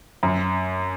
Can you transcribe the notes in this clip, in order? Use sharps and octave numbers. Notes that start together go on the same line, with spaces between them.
F#2